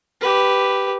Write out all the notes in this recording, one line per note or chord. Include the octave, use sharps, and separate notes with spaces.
G4 B4